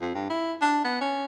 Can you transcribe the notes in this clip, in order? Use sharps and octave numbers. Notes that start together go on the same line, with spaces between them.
F2
G2
E4
D4
B3
C#4